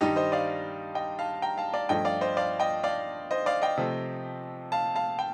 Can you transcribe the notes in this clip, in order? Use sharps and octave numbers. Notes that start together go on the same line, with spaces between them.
G2 D#3 G3 D#4 G4
C5 D#5
D5 F5
D#5 G5
F5 A5
G5 A#5
F5 A5
D5 F5
G2 F3 A3 D#5 G5
D5 F5
C5 D#5
D5 F5
D#5 G5
D5 F5
C5 D#5
D5 F5
D#5 G5
C3 F3 A3
F5 A5
F5 A5
G5